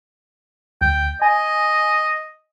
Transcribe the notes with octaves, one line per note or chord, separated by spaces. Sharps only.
D2 G5
D#5 G#5